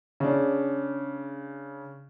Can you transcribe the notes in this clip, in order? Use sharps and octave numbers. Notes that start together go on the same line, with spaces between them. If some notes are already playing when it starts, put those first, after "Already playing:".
C#3 D4